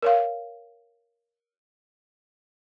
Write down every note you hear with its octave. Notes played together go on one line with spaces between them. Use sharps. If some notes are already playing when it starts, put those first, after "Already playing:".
A#4 C#5 F5